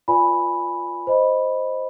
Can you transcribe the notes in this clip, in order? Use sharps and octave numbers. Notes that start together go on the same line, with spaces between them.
F4 B4 D5 G#5 B5
C5 D#5 B5